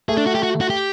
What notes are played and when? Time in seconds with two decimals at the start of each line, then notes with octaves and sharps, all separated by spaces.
0.09 A3 G#4
0.17 D4
0.27 F#4
0.35 G4
0.43 F#4
0.61 F#4
0.70 G4